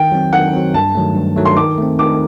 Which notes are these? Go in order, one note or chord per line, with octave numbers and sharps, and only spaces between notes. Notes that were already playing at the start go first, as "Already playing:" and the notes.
Already playing: D#3 G5
F#3 C4
D#3 F#5
F#3 C4
G2 A5
D#3 F#3 A3
G2
D#3 F#3 A3
C6
D#3 D6
A3 C4
D#3 D6